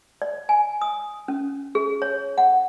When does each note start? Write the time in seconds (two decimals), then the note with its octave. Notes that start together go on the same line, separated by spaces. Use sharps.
0.22 D5
0.49 G#5
0.82 D#6
1.28 C#4
1.75 G#4
2.02 C#5
2.38 F#5